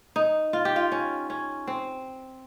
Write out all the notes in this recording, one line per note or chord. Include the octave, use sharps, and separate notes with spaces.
D#4
F4
G4
F4
C#4
C#4
C4